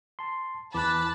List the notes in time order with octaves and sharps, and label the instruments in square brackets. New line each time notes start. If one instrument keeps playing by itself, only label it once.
[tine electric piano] A5 C6
[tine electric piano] E2 E3 [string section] A5 B5 [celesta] D6 F#6